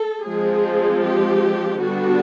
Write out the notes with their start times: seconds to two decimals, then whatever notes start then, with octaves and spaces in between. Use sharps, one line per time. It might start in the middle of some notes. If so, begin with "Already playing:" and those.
Already playing: A4
0.23 F3 G#3 C4 G#4
1.02 G4
1.80 D3 G3 B3 D4 F#4